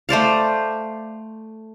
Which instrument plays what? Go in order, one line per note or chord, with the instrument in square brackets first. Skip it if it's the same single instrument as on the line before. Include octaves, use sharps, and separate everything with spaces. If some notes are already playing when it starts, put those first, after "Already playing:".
[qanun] A3 C5 D5 F5